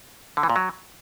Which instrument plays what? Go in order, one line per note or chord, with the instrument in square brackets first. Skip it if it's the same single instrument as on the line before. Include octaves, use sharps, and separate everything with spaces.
[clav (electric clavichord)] D3
E3
A#2
F#3